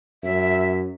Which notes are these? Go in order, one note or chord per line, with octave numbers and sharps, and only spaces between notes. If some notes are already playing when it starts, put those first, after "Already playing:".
F#2 E5